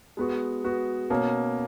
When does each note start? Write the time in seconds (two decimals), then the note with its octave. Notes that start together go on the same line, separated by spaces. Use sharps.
0.17 G#3 B3 F#4
0.64 G#3 B3 F#4
1.10 B2 A#3 C#4